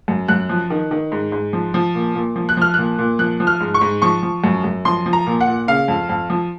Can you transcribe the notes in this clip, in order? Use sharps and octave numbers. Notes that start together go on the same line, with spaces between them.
F#2
F#2 F#6
F3
D#3
D#3
G#2
G#2
F3
F3
A#2
A#2
F3
F#6
F3 F6
A#2 F#6
A#2
F3 F#6
F3
F6
G#2
C#6
G#2
F3 C#6
F3
F#2
F#2
F3 C6
F3
A#5
A#2
F#5
A#2
C#3 F5
F2
F2
F3